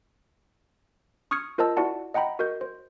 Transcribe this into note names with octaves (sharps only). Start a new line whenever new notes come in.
C#6 D#6 F6 G#6 C#7
F4 A#4 C5 D#5 A5 E6
E4 F#4 D5 F#5 A5
D#5 F#5 G5 A#5 B5
F#4 A#4 D#5 G6
C5